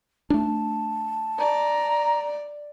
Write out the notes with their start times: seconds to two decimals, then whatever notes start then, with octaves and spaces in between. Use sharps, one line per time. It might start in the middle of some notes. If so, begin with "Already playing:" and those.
0.30 A3 D4 A5
1.39 D5 A#5